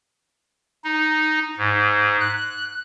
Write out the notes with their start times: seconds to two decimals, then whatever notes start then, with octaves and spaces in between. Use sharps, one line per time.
0.84 D#4
1.57 G#2
2.20 F#6